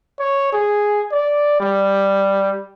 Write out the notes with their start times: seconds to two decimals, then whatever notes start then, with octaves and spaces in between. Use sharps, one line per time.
0.19 C#5
0.52 G#4
1.12 D5
1.60 G3